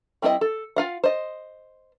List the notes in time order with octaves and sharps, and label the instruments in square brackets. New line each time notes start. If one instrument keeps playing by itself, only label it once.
[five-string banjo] G3 C4 E4 A#4 D#5
A4
F4 F5 F#5
C5 D#5